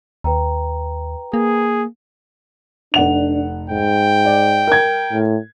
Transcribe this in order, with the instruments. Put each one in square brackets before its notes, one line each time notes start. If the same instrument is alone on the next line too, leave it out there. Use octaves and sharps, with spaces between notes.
[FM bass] D#2 [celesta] B4 G5 A#5
[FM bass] A#3 [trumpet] G#4
[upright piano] F1 F#5 F7 [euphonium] D4
[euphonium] G#2 [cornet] G5
[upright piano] D5
A#4 G#6
[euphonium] A2